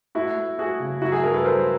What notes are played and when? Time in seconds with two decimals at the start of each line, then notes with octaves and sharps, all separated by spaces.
0.15 A3 E4 F#4
0.37 A3
0.58 A3 F#4 G#4
0.80 C#3
1.02 F#3 E4 F#4
1.12 F#4 G#4
1.23 G2 G#4 A#4
1.34 A4 B4
1.44 F#3 A#4 C5